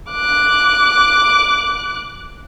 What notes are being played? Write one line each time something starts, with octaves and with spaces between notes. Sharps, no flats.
D6 F#6